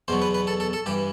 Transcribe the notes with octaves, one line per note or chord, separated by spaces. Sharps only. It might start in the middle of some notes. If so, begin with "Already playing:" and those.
E2 B2 F#3 C5
B4
B4
A4
A4
A4
G2 E3 G4